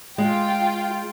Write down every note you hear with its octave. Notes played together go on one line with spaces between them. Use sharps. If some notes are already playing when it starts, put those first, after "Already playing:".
G#3 F4 G5